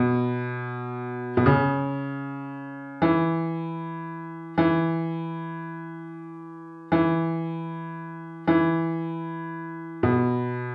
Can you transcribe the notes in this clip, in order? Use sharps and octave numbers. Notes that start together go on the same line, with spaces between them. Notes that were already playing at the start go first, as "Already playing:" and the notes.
Already playing: B2
B2
C#3
E3
E3
E3
E3
B2